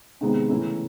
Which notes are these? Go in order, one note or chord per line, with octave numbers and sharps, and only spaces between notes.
C3 D#3 G#3 B3
C#3 E3 A3 C#4 E4